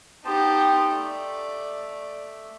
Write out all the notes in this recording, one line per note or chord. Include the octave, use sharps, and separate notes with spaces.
B3 D#4 G4 C5 A5
A3 D5